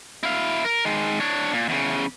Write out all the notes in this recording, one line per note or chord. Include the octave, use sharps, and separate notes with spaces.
E4 F5
A#4
D#3 G#3
D4 C#5
A#2
E2 C#3